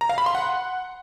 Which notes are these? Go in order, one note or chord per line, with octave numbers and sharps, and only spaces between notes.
A#5
F5
B5
C6
F#5